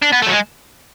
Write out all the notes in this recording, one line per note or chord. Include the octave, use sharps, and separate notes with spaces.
D4
B3
A3
F#3
G#3